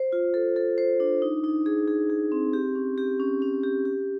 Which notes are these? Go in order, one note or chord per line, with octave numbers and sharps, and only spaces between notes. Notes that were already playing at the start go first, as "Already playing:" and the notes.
Already playing: C5
F4
A4
A4
C5
D4
D#4
D#4
G#4
G#4
G#4
C4
G4
C#4
G4
C#4
C#4
G4
G4